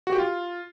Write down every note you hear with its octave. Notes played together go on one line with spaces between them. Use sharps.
F#4
G4
F4